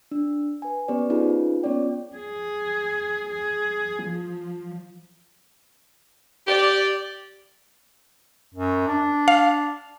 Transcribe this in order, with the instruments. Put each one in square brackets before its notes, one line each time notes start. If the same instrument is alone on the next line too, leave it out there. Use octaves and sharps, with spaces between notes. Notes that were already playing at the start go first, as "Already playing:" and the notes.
[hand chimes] D4
B4 G#5
B3 C#4 G4 B4 C5 D5
C4 C#4 D#4 F4 G#4 B4
B3 C#4 F4 C#5 D5 G5
[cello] G#4
G#4
F3
[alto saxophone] G4 [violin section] D5
[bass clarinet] F#2
D4
[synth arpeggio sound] F5